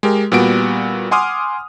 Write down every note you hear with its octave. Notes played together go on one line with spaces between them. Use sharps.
G#3 G4 A#4
A#2 G3 B3 F#4 D7
F#5 G#5 C6 D6 D#6 F6